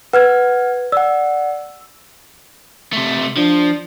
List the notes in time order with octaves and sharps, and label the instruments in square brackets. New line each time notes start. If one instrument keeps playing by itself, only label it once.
[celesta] B4 [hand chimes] F#5 F6 G#6
[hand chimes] D5 F#5 [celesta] E6
[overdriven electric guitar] C3 A3
[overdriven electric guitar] F3 [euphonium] D4